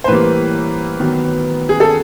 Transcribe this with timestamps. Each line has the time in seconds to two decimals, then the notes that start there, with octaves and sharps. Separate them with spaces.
0.04 C5
0.08 A2 E3 G3 A#3 B4
1.00 D#3 F#3 B3
1.69 G#4
1.80 A4